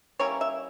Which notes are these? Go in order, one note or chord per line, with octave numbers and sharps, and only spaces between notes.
G3 A#3 C#4 E4 C#5
E5